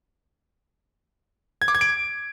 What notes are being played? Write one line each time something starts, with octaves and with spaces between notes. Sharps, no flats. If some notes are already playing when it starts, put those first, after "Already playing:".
G#6
D6
G#6
D7